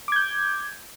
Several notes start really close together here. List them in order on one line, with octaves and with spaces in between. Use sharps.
D6 G#6 G6